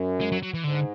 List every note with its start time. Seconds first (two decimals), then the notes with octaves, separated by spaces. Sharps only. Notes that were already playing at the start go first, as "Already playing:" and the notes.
Already playing: F#2
0.21 G#3
0.32 F#3
0.43 F#3
0.54 E3
0.64 G#2 D3